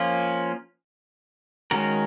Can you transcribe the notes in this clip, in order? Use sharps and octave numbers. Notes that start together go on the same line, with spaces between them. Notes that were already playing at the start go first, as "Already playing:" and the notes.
Already playing: F3 A#3 C#4 F4
D#3 G#3 C#4 F#4 A#4